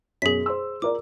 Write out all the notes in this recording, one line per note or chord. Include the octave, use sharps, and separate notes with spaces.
F#2 B2 G#4 B6
C5 C6 E6
F4 A#4 D5 D6